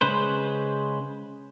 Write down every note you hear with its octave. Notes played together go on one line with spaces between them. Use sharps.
C#3 G#3 B4 C5